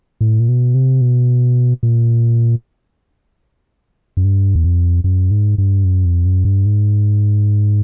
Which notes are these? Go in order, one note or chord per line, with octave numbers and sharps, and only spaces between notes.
A2
A#2
B2
C3
B2
A#2
F#2
G2
E2
F2
F#2
G#2
G2
F#2
F2
F#2
G2
G#2